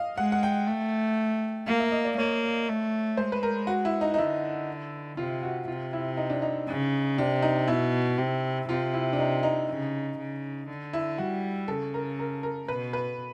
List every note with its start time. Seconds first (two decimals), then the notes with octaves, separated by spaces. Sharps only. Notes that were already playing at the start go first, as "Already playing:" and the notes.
Already playing: D#5 F5
0.17 G#3 F#5
0.32 F#5
0.43 G5
0.67 A3
1.67 A#3 F5
1.80 E5
1.92 D#5
2.05 D5
2.17 A#3 C#5
2.68 A3
3.17 G#3 C5
3.32 B4
3.43 A#4
3.67 F#4
3.85 E4
4.01 D#4
4.14 D#4
4.18 D3 E4
5.17 C3 F4
5.43 F#4
5.68 C3 F4
5.93 E4
6.17 D#4
6.30 D4
6.42 D#4
6.68 C#3
7.18 C3 D4
7.42 D#4
7.68 B2 E4
8.18 C3
8.69 C3 F4
8.94 E4
9.13 D4
9.19 D#4
9.43 D#4
9.69 C#3
10.18 C#3
10.68 D3
10.93 E4
11.18 G3 F#4
11.68 C#3 A4
11.94 A#4
12.19 A#4
12.43 A#4
12.68 B2 B4
12.93 B4